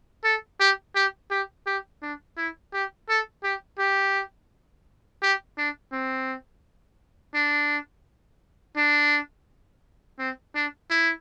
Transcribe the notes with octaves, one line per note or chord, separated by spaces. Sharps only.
A4
G4
G4
G4
G4
D4
E4
G4
A4
G4
G4
G4
D4
C4
D4
D4
C4
D4
E4